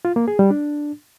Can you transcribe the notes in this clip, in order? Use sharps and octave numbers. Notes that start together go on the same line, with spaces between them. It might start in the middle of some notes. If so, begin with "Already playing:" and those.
F4
A#3
G#4
G3
D4